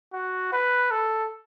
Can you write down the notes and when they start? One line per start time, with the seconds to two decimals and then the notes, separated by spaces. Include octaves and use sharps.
0.13 F#4
0.53 B4
0.91 A4